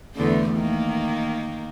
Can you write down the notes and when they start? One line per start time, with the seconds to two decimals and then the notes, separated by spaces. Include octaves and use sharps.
0.15 E2 D3 A3
0.56 D#3 A#3